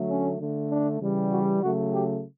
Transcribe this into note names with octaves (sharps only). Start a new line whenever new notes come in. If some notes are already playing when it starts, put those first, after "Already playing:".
Already playing: D3 F#3 A3
C#4
D3 A3
D4
C#3 E3 G3
F#4
C#3 F#3 A3 F#4
G4